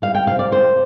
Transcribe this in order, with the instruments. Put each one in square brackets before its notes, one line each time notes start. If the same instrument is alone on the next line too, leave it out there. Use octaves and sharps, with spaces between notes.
[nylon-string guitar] G3 F5
G5
C3 F5
D5
C3 C5